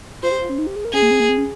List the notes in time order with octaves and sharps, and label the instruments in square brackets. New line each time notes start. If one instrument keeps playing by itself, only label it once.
[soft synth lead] F4 [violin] C5
[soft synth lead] G4
F4
C#4
D#4
G4
G#4
A#4
[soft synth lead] C#4 [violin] G#4
[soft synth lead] A#3
C4
A#3
C4
C#4